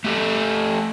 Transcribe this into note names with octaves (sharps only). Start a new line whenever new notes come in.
A3 G4 A4